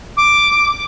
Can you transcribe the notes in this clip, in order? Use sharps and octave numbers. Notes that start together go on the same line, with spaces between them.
D6